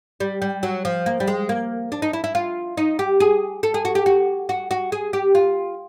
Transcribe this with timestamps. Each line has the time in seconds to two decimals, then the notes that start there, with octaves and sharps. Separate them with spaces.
0.20 G3
0.42 G3
0.63 F#3
0.85 F3
1.06 A#3
1.20 G3
1.28 G#3
1.49 A#3
1.92 D4
2.02 D#4
2.13 E4
2.24 E4
2.35 F4
2.77 D#4
2.99 G4
3.20 G#4
3.63 A4
3.74 G#4
3.85 F#4
3.95 G4
4.06 F#4
4.49 F#4
4.71 F#4
4.92 G#4
5.13 G4
5.35 F4